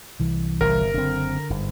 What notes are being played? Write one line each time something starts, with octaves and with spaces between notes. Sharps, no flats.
C2 E3
G1 C3 A#4
F#1 D3 C4
G1 G#2